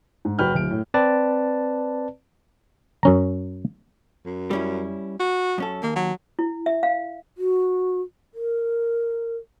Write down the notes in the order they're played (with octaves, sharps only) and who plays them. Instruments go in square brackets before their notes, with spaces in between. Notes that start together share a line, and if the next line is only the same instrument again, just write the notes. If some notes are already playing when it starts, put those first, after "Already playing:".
[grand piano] G#2
F#1 F#4 B4 G5 F6 G6
D1 D7
A2
[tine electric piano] C4 B4 D5 A5
[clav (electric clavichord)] F#2 C#4 A#5
[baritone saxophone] F#2
[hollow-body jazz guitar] G3 C#4 E4
[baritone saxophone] F#4
[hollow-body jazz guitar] F#2 C#4 A4
[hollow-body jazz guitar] D#2 [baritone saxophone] A#3
[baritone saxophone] F#3
[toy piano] E4
E5
F5
[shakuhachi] F#4
A#4